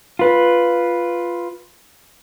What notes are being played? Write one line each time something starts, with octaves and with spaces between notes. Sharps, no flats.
F4 B4